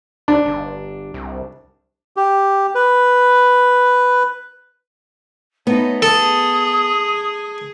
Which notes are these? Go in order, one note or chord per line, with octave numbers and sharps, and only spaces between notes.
C#2 D4
G1
C2
G4
B4
A3 B3 D#4 C#5
G#4 A4 D#6